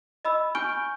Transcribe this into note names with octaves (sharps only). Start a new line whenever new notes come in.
D#5 B5 E6
G#5 C#6 F6 G6 D7 G7